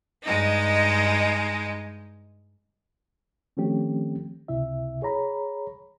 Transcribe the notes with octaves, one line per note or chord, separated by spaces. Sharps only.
G2 G#3 D#4
D#3 F3 A3 C4 C#4 G4
C#2 C3 E4 E5
G#4 C#5 A#5 B5